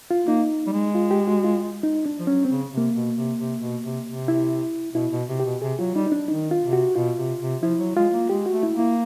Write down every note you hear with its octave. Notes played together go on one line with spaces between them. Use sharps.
F4
A#3 D#4
G3
G#3
F4
G4
F#4
F4
D#4
D4
F3
F#3 C#4
C4
C#3
C3 A#3
B2
C3
C3
B2
C3
C3
E4
B2 E4
B2
C3
G4
B2
C3 G#4
F#3 F4
G3 D#4
D#4
D4
D#3 D#4
F4
C3
F#4
B2 F4
C3
C3
F3 E4
F#3
G#3 F4
A#3
G#3 G4
F#4
A3
E4
A#3
E4